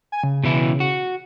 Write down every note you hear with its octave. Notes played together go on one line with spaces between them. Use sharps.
G#5
C#3
B2 E3 E4
F#4